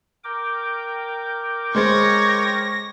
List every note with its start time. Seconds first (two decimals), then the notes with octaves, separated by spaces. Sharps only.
0.24 A#4 G5 D6
1.75 G#3 C5 C#5 A6 A#6